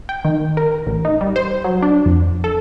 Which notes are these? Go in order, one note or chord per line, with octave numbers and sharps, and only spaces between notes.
G5
D#3
A#4
A1
D#4
G3
C5
F#3
D4
F2
A4